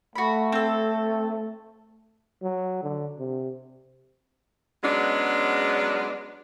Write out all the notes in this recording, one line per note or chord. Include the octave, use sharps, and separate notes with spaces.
A3 F#4 B5
C4 A4
F#3
D3
C3
F#3 G#3 B3 C#4 D4